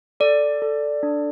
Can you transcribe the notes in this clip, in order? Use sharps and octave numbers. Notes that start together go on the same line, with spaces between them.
A4 D5
A4
D4